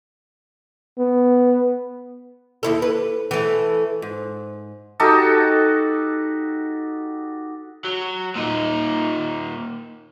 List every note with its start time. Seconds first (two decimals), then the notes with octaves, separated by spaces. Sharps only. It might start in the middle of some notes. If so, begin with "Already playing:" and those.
0.99 B3
2.63 D#2 E4 A4
2.82 B4
3.31 E3 A3
4.02 G#2
5.00 D#4 F#4 G4 A4
7.84 F#3
8.36 A#2 D#4